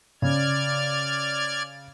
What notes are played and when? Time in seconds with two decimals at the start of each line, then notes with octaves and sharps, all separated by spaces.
0.22 C#3 D5 F6 G#6